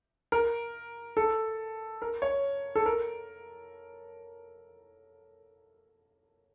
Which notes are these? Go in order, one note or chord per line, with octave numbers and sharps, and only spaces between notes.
A#4
A4
A#4
C#5
A4
A#4